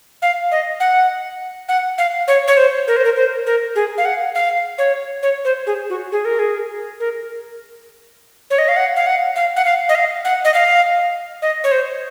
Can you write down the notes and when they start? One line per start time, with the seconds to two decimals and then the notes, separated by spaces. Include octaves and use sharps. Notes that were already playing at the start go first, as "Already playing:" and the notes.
0.22 F5
0.52 D#5
0.80 F#5
1.69 F#5
1.98 F5
2.28 C#5
2.48 C#5
2.57 C5
2.88 A#4
2.97 C5
3.05 A#4
3.16 C5
3.46 A#4
3.75 G#4
3.98 F5
4.05 F#5
4.35 F5
4.78 C#5
5.23 C#5
5.45 C5
5.67 G#4
5.90 F#4
6.12 G#4
6.25 A#4
6.39 G#4
7.00 A#4
8.50 C#5
8.59 D#5
8.68 F5
8.76 F#5
8.96 F5
9.06 F#5
9.36 F5
9.56 F#5
9.65 F5
9.89 D#5
9.95 F5
10.25 F#5
10.45 D#5
10.54 F5
11.42 D#5
11.64 C#5
11.72 C5